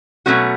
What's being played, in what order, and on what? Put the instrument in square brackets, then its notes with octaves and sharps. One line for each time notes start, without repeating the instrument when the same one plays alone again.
[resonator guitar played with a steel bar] B2 F#3 A3 C#4 F#4